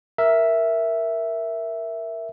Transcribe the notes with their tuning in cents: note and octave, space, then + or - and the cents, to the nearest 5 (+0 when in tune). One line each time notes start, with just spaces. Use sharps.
A#4 +0 E5 +0